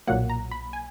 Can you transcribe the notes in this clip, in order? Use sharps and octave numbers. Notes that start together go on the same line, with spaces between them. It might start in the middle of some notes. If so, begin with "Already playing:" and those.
B1 A#2 F#3 A#3 F#5
A#5
B5
G#5